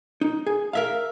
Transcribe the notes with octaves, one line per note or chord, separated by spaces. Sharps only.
D#4
G#4
A#4 E5 F5